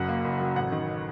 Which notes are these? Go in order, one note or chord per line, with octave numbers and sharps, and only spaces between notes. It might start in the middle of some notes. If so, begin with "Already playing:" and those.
Already playing: F#1 F#2 F#3 F#5
A#3
F#1
F#3
A1 F#5
D#3